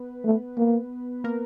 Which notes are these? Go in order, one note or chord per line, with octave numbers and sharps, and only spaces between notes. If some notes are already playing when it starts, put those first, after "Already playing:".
Already playing: B3 B4
A3
A#3
A#3 A#4